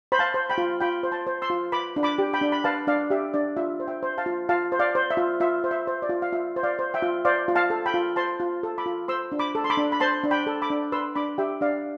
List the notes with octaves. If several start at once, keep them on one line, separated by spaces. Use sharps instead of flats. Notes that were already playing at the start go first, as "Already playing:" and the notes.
C5 B5
F5 A5
C5
G5 B5
F4
F4 G5 B5
C5
A5 C6
C5
C6 E6
F4
B4 B5 D6
D4
B5 D6
G4
G5 B5
D4
B5
B4 F5 A5
D4 D5 F5
G4 E5
D4 D5
F4 E5
C5
E5 G5
C5
F5 A5
F4
F4 F5 A5
C5
D5 F5
C5
E5
F4
F4 E5
C5
E5
C5
D5
F4
F5
F4 E5
C5
D5 F5
C5
E5 G5
F4
C5 D5 F5
F4
F5 A5
A4
G5 B5
F4
C5 A5 C6
F4
A4
B5 D6
F4
C5 C6 E6
D4
B5 D6
A4
C6
B5 D6
D4
B5
C5 A5 C6
D4
G5 B5
A4
B5 D6
D4
B4 C6 E6
D4 B5 D6
G4 E5 G5
D4 D5 F5